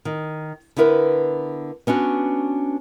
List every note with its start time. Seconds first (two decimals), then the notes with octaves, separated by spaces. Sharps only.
0.05 D#3
0.76 D3 B3 E4 A#4 B4
1.87 B3 C#4 D4 F#4